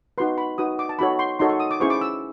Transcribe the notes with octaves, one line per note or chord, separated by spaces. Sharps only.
D#4 F#4 B4 C6
B5
D#4 F#4 B4 D#6
D6
A5
D#4 F#4 A4 C#5 B5
C6
D#4 F#4 A4 C#5 C6
C#6
D#6
D6
C#4 E4 G#4 C5 C#6
D6
E6